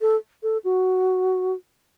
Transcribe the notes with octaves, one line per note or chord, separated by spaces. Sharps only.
A4
A4
F#4